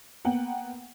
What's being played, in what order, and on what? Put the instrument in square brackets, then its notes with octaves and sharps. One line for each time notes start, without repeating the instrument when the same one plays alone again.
[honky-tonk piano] A#3 B3 F#5 G5